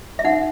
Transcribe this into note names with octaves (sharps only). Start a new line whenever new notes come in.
E5
D#4 F#5